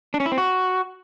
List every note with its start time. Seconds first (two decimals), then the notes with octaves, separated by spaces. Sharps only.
0.14 D4
0.20 C#4
0.26 E4
0.32 C4
0.38 F#4